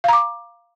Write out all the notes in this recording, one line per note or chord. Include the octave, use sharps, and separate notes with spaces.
F5 A#5 D6